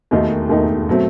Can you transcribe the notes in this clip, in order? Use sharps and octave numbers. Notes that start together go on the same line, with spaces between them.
E1 D#2 D#3 A3 D#4
E1 D#2 D#3 A3 D#4
B2 F#3 A3 C4